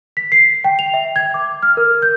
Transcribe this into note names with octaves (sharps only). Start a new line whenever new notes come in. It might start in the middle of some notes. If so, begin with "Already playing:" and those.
B6
C7
G5
F7
E5
G#6
D6
F6
A#4
G6